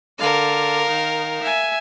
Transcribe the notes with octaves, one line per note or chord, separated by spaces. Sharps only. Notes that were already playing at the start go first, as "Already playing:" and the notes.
D3 A#4 F5
D#3
E5 G#5